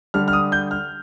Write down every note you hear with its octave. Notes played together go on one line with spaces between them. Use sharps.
D3 G3 D4 F6
F6
D#6
G6
F6